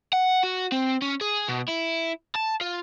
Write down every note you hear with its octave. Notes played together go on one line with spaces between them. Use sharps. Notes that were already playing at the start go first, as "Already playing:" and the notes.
F#5
F#4
C4
C#4
G#4
B2
E4
A5
F4